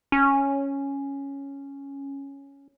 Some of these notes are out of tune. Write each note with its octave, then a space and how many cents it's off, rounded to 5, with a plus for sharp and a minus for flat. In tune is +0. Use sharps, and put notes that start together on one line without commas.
C#4 +0